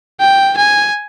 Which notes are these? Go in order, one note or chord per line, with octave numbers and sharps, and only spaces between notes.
G5
G#5